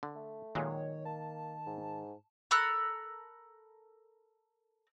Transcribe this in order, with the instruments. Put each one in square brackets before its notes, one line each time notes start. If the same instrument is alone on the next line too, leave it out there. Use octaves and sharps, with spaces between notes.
[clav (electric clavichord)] D3
[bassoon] A3
[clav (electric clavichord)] A#2 F#3 G#3 [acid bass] D#3 [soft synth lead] C#5
[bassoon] A#3 [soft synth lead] A5
[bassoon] G#2
[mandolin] A4 A#4 B5 F#6